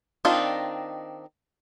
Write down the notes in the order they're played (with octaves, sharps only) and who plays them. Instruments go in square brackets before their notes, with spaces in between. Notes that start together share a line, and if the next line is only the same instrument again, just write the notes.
[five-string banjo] D#3 C4 D4 D#4 F4